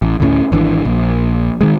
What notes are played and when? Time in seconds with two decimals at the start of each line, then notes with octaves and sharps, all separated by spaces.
0.02 A1
0.20 D2 A2 C#4
0.52 G#1 E3 D4
0.85 A#1
1.61 D#3 G#3